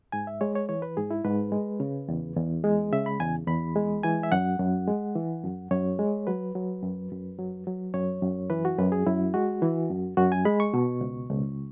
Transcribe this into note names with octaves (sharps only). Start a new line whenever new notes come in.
G#2 G#5
E5
G#3 C#5
C#5
E3 C#5
B4
G#2 G#4
E4
G#2 B4
G#3
C#3
E2
E2
G#3
C#3 E5
B5
E2 G#5
E2 B5
G#3
E3 G#5
E5
F#2 F#5
F#2
G#3
E3
F#2
F#2 C#5
G#3
F#3 B4
F#3
F#2
F#2
F#3
F#3
F#2 C#5
F#2
E3 B4
F#4
F#2 B4
G#4
F#2 E4
G#3 F#4
E3
F#2
F#2 F#4
G#5
G#3 B5
C#6
B2
C#2
C#2